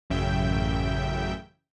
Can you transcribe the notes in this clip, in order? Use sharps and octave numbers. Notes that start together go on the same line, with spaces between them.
A1 F#2 C#3 E5 G5 G6